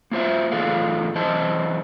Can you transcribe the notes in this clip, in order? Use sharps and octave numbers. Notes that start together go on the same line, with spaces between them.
A#3 F4 C5 E5
A2 E3 F4 G#4 A4 F5
F#2 E3 E4 C5 D#5 A5